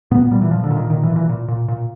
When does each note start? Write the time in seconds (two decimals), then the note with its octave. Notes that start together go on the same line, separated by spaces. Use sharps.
0.11 A#2 B3
0.31 A#2 G3
0.42 E3
0.51 A#2 F3
0.64 D3
0.71 A#2
0.77 D#3
0.90 A#2 D#3
1.03 E3
1.10 A#2
1.16 E3
1.29 A#2
1.48 A#2
1.68 A#2